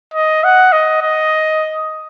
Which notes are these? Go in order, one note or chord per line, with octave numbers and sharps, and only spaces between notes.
D#5
F#5
D#5
D#5